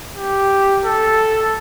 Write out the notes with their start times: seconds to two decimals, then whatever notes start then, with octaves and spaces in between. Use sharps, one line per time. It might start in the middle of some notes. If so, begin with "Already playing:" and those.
0.17 G4
0.84 A4